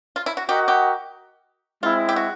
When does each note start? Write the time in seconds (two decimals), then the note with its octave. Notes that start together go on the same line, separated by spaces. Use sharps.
0.16 F4
0.26 E4
0.37 F#4
0.48 F#4 G4 A#4 D#5 F#5
0.68 G4
1.82 G#3 C4 E4 F4
2.09 G4
2.16 F#4